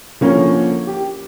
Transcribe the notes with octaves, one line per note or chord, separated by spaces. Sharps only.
D3 F3 A#3 C#4
G4